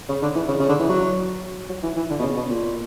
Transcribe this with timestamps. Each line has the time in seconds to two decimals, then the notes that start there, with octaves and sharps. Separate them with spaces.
0.09 C#3
0.22 D3
0.35 E3
0.48 C#3
0.59 C#3
0.69 D3
0.80 E3
0.89 F#3
1.69 F#3
1.83 E3
1.96 E3
2.10 D3
2.19 B2
2.23 C#3
2.36 B2
2.50 A#2